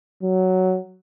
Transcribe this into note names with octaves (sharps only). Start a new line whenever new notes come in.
F#3